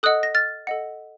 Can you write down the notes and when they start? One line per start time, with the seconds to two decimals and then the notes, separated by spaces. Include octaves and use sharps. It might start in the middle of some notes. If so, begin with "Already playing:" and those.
0.03 A4 D#5 F#5 D#6 F#6
0.23 A#6
0.35 F6 A6
0.67 A4 D#5 F#5